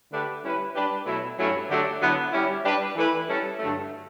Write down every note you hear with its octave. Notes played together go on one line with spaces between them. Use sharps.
D3 A3 D4 G4 B4
G3 C#4 E4 B4
G3 D4 G4 B4
B2 F#3 A3 E4
G2 F#3 A3 C#4 E4
D3 F#3 A3 D4 G4
D3 F#3 B3 E4
G3 C#4 E4
G3 D4 G4 B4
E3 A3 E4 B4
G3 C#4 E4 A4
G2 D3 F#3 A3